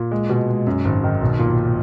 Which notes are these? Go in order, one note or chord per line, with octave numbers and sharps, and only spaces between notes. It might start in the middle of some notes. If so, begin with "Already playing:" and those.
Already playing: A#2
G#3
B2
G#3
F#2
G#1
D#3
B1
A#2